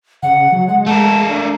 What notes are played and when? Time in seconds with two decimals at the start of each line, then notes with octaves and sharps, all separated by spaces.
0.23 C#3 F#5
0.52 F#3
0.68 G#3 F#5
0.87 A3 A#4 A5
1.29 D4